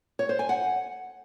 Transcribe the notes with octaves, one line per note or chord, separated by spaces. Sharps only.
C#5
C5
G#5
F#5